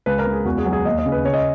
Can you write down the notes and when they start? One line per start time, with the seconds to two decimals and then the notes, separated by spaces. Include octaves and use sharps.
0.06 C#2 B4
0.19 A#4
0.26 C#2
0.33 G#4
0.45 E2 F#4
0.58 G#4
0.65 F#3
0.73 G#4
0.85 D#2 D#5
0.99 D#5
1.06 C#3
1.12 B4
1.25 C#3 C#5
1.34 D#5